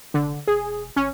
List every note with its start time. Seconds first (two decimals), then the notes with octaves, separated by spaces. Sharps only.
0.14 F1 D3
0.47 E1 G#4
0.96 G#1 C#4